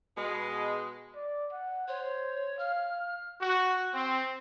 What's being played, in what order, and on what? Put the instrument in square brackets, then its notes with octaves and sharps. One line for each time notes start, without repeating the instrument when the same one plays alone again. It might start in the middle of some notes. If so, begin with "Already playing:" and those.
[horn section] B2 G#3
[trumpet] D5
F#5
[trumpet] C5 [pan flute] C#5
[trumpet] F5 [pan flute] F6
[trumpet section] F#4
C4